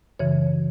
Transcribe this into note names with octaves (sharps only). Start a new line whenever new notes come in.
F#2 C#3 E3 C#5